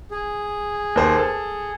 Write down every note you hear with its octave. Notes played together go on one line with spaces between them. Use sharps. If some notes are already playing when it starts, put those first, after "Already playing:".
G#4
D#2 C5
A4